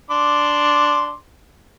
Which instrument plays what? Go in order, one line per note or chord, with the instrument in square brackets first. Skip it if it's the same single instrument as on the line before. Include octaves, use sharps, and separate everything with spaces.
[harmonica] D4 C6 D6